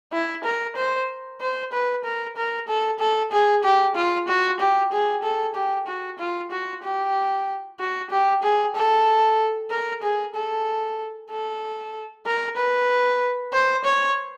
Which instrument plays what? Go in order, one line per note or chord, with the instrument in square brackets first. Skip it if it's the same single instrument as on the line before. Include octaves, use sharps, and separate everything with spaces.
[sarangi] E4
A#4
C5
C5
B4
A#4
A#4
A4
A4
G#4
G4
F4
F#4
G4
G#4
A4
G4
F#4
F4
F#4
G4
F#4
G4
G#4
A4
A#4
G#4
A4
A4
A#4
B4
C5
C#5